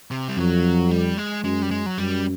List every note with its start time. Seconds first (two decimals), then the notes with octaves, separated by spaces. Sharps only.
0.11 C3
0.29 G3
0.37 F2 F#3
0.91 G3
1.17 G#3
1.44 F#2 G#3
1.62 G3
1.71 G#3
1.86 F#3
1.98 F#2 G3